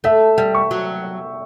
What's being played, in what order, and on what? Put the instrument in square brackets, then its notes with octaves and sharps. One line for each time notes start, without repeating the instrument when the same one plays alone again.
[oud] A3 [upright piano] E5
[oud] G3 [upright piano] G5
[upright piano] C#6
[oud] F#3